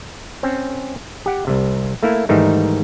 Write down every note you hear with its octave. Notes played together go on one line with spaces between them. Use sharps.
C4 C#4
G4 F#5
C2 C3
A3 A#3 E4
G#2 D#3 E3 G3 A3 D#4